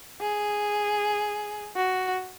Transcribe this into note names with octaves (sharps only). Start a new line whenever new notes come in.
G#4
F#4